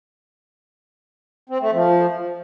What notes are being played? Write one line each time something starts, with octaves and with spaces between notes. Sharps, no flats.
C4
A3
F3